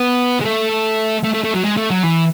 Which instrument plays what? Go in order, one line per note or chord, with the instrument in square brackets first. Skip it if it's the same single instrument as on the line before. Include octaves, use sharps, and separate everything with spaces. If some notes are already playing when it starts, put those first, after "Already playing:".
Already playing: [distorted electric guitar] B3
G#3
A3
A3
A3
A3
F#3
G#3
A3
F#3
E3